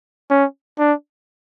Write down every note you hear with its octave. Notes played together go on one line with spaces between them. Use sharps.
C#4
D4